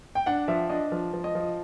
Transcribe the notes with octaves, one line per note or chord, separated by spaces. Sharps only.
G5
D4 F#5
F3 E5
D4 D#5
F3
F3
D#5
F3